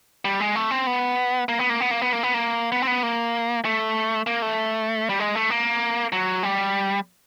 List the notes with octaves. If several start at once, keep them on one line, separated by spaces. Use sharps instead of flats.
G3
G#3
A3
C4
B3
A#3
B3
A#3
B3
A#3
B3
A#3
B3
A#3
B3
C4
B3
A#3
A3
A#3
A3
G3
G#3
A3
A#3
F#3
G3